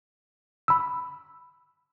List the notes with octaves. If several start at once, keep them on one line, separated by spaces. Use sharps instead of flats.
B5 E6